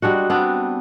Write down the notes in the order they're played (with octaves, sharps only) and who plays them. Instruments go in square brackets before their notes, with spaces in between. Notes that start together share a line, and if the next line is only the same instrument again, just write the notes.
[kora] G3 G#3 D4 F#4
B3 C4 D4